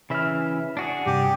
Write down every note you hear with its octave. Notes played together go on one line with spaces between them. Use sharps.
C#3 E3 E5 B5 F6
D4 F#4 G#4
G2 C3 G4